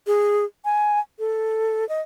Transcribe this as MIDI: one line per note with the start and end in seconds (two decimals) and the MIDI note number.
0.07 0.45 68
0.65 1.00 80
1.19 1.87 69
1.89 2.01 75